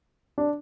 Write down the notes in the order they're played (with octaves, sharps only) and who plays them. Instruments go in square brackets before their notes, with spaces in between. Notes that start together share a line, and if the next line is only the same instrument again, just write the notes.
[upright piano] D4